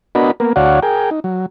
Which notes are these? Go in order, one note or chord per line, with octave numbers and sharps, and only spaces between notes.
B3 D4 F#4 A#4 D#5 B5
A#3 B3 A#4
D2 F#4 C#5 D5 F5 F#5
G#4 A#4 G5
D#4
F#3